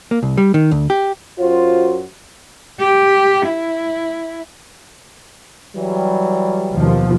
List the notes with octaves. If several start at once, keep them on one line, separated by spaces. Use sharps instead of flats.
A#3
C2
G3
D#3
D2
G4
F#2 F4 F#4 C5
G4
E4
E3 F#3 G3
D#2 B2 F3